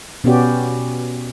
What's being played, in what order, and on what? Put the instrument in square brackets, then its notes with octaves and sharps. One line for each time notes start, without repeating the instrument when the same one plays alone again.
[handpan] B2 B3 C#4 F#4 G4 D5